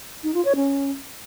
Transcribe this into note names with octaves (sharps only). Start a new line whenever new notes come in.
D#4
F4
C#5
C#4